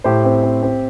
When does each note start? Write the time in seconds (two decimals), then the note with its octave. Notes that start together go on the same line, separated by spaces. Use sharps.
0.04 A2 G4 C5
0.25 C4
0.43 C4
0.62 C4